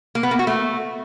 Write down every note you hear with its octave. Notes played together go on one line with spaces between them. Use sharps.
A#3
B3
A#3
F#4
A3